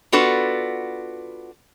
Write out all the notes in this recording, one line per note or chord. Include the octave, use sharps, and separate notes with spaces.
B3 D4 F4 F#4 A4 B4